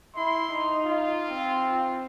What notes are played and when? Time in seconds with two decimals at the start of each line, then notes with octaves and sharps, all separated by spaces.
0.16 E4 C6
0.52 D#4
0.85 F4
1.29 C4